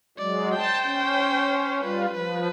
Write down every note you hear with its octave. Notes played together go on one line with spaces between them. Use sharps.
F#3 G#3 D5
C5 G5 A5
C#4
G3 F4 B4
F3 B4